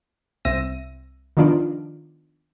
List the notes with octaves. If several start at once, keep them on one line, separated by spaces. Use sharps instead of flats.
C2 C4 E5 E6 A#6 D#7
D#3 F3 B3 D4 F4 D5